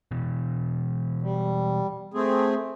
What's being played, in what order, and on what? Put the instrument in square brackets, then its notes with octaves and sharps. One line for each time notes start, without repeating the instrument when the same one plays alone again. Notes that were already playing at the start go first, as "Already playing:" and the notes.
[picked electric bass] B2 E3
[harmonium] G3
A3 C4 G#4